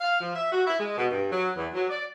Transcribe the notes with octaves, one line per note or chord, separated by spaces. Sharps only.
F5
F3
E5
F#4
E4
G#3
B2
G2
F#3
E2
F#3
D5